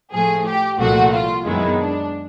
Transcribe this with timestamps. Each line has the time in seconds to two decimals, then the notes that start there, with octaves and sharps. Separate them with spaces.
0.12 A2 F3 A3 G#4
0.46 G4
0.79 C2 A#2 F3 A3 F#4
1.13 F4
1.46 F#2 D#3 G#3 B3 E4
1.79 D4